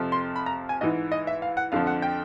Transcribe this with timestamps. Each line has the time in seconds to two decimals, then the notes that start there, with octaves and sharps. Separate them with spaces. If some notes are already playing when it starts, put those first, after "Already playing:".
Already playing: F2 C3 F3
0.12 C6
0.36 B5
0.46 A#5
0.69 G#5
0.81 G#2 E3 D#5
1.12 D#5
1.27 E5
1.42 F5
1.57 F#5
1.72 F2 D3 F3 F5
1.87 F#5
2.02 G5